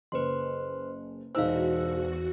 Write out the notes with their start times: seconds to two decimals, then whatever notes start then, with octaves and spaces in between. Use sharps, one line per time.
0.12 F#1 B4 C5 C6
1.35 E1 E2 D#4 F#4 C5 F5 E6